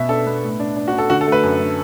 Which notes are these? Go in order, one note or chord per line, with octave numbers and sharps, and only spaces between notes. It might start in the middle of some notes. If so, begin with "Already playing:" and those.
Already playing: B2 B3 E5
D4 A4
B3
A2
D4
D4
F#4
D4
A4
D3 F#4
A4
A3
B4
F#2
D3